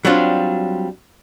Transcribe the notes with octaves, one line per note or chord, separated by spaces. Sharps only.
F#3 G3 C4 D4 F4